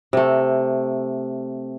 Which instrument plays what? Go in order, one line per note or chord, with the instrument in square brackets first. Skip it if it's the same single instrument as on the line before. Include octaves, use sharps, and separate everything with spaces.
[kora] C3 A3